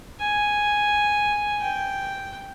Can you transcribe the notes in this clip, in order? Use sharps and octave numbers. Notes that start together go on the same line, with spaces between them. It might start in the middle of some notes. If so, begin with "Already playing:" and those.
G#5
G5